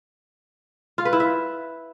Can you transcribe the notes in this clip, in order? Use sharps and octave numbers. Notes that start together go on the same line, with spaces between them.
F4
B4
E4
E5